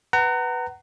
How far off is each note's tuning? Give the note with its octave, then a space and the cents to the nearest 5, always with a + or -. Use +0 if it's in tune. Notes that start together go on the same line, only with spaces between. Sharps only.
B4 +0 F#5 +25 A#5 -25